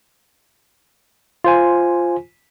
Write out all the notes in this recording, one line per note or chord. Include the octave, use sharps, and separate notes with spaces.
F4 C5 G#5